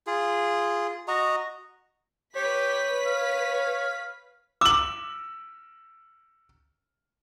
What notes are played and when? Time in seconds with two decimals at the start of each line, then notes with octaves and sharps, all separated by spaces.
0.07 F4 G#4
1.08 F#4 D#5 A#5
2.36 G4 B4 C#5 B6
3.06 F5
4.61 D6 E6 F#7